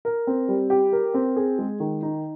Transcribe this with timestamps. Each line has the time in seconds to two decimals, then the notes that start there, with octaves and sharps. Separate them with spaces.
0.05 A#4
0.27 C4
0.48 G3
0.70 G4
0.92 A#4
1.14 C4
1.36 G#4
1.59 G#3
1.80 D#3
2.02 D#4